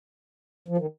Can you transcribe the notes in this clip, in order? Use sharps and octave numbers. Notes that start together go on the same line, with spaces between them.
F3
D#3